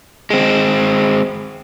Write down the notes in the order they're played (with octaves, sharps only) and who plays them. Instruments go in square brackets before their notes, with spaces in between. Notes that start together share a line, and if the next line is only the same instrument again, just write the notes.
[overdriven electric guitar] G#3 C4